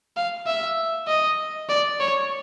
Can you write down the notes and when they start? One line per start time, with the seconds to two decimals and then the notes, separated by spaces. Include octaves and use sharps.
0.17 F5
0.47 E5
1.08 D#5
1.69 D5
2.00 C#5